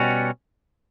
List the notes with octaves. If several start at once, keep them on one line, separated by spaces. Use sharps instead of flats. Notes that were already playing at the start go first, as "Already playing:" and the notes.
Already playing: B2 G3 C#4 F#4